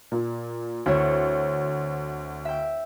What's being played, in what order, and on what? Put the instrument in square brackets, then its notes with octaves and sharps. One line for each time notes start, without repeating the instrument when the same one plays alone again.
[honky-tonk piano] A#2
[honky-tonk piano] D2 [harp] C4 E4 C#5
[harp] E5 G5